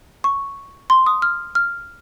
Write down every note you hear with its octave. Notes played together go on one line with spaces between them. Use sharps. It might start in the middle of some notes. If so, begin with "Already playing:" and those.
C#6
C6
D#6
F6
F6